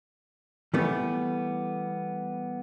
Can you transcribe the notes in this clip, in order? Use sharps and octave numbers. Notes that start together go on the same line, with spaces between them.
E3 G3 A3 B3